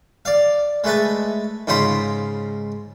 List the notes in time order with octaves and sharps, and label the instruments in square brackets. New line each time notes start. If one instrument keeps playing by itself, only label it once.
[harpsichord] D5 F5
G#3 A3 B4 A5
G#2 C#3 F4 C5 B5